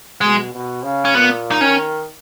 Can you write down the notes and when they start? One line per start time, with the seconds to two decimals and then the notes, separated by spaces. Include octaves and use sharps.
0.21 B2 G#3
0.53 B2
0.83 C#3
1.05 C#4
1.15 A#2 B3
1.51 D#4
1.61 D#3 C#4